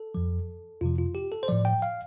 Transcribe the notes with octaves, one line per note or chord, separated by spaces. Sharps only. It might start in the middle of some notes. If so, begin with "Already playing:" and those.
Already playing: A4
F2 F3
F2 C3 F3 F4
F4
G4
A4
C5
A2 F3 D5
G5
F5